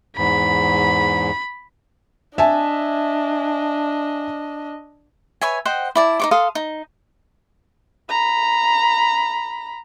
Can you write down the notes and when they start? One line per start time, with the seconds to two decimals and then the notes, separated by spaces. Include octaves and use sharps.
0.17 E2 G#2 B5
2.38 D4 D#5 E5 G#5 A5
5.41 B4 C#5 E5 G#5
5.65 C5 D#5 F#5 G5
5.95 E4 D5 A5
6.20 D#4 C#5 D6
6.31 A4 F5 C6 D#6
6.55 D#4
8.09 A#5 B5